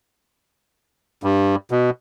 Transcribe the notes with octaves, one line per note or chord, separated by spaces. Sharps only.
G2
B2